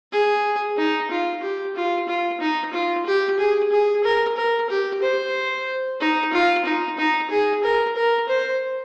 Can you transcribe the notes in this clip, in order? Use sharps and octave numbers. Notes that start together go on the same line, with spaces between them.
G#4
D#4
F4
G4
F4
F4
D#4
F4
G4
G#4
G#4
A#4
A#4
G4
C5
D#4
F4
D#4
D#4
G#4
A#4
A#4
C5